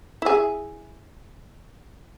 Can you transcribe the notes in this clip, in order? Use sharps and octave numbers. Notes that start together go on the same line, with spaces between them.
E4 G#4